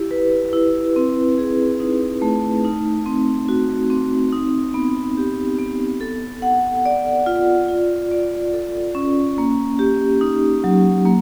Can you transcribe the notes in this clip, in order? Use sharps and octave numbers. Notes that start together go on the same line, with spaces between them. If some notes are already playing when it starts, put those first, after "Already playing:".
Already playing: E4 G4
B4
E4
C4
G#4
D#4
A3
D#4
C4
F#4
C4
D#4
B3
G4
B3
A4
F#5
D5
F4
F4
D5
A4
C#4
A#3
G4
D#4
F#3
A#3